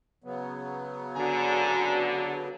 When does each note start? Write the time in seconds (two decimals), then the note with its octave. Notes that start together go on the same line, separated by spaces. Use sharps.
0.24 C#3 F#3 B3
1.16 D3 F#4 G#5 A#5